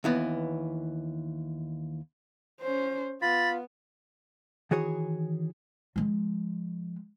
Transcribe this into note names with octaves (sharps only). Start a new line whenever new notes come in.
D#2 E3 B3
C#4 C5
B3 F4 B5 A6
D#3 E3 F#4 G#4 C#5
F3 G#3